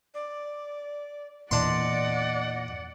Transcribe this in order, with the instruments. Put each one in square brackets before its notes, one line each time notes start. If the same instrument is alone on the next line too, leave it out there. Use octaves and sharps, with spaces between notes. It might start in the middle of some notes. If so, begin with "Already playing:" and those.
[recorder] D5
[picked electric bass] E2 A#2 E3 [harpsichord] D4 C6 [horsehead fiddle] D5 F#5 [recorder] D#5